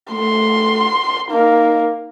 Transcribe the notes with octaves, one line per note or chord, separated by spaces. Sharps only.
A3 C6
A#3 D#4